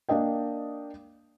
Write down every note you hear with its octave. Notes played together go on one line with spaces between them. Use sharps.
A#3 D4 D5 D#5 G5